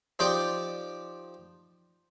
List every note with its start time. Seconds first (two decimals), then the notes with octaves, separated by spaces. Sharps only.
0.19 F3 D#4 G4 D5 G5